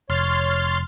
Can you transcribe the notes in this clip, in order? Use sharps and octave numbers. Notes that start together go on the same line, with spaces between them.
F1 C#5 C6 F6 A6